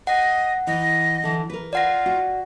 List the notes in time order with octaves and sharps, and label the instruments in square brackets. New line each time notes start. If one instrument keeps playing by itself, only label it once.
[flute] D#5 [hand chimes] F#5
[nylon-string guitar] E3 [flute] D#5
[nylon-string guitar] D3 E3
A#4 B4
[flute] F4 [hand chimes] D5 F#5 A#6
[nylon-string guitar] F#4